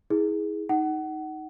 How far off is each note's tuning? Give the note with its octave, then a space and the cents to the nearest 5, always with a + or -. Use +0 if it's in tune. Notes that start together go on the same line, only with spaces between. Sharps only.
E4 -30 G#4 +0
D#4 +10 F#5 +25